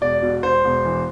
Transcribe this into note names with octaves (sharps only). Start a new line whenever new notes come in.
E1 D5
B2
E1 C5
E1
E3